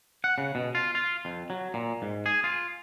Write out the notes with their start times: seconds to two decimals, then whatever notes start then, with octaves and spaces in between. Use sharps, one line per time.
0.24 F#5
0.38 C#3
0.55 B2
0.75 F4
0.95 F4
1.25 F2
1.50 F#3
1.74 A#2
2.02 G#2
2.26 G#4
2.44 F4